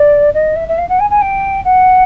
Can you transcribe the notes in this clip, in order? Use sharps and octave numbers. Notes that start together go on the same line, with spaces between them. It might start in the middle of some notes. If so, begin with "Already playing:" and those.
Already playing: D5
D#5
E5
E5
F5
F#5
G#5
G#5
G5
F#5